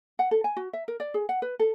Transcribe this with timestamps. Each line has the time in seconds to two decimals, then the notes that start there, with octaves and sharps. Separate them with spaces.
0.19 F#5
0.31 A4
0.44 G#5
0.57 F#4
0.73 E5
0.88 A#4
1.00 D5
1.14 G#4
1.29 F#5
1.42 B4
1.59 A4